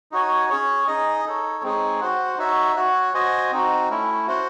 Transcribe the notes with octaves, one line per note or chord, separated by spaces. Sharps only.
D#4 F#4 C#5 G#5
C#4 G#4 C#5
D#4 G#4 D#5
D#4 A4 C#5
G#3 C4 D#4 G#4 C#5
F#4 C5 F#5
D#4 F#4 C#5 E5
F#4 C#5 F#5
F#4 C5 D#5 G#5
C4 D#4 F#4
A3 C#4 E4
F#4 C5 F#5